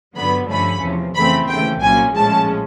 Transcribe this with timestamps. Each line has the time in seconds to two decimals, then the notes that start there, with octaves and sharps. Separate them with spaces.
0.17 G2 D3 F#3 B3 B5
0.49 G2 D3 F3 A3 C#4 B5
0.83 E2 C3 F3
1.16 F2 C#3 E3 A3 C4 B5
1.49 D#2 C#3 E3 A3 G5
1.81 C2 A#2 F#3 A#3 C#4 G#5
2.15 A#1 A2 F3 G#3 C#4 A5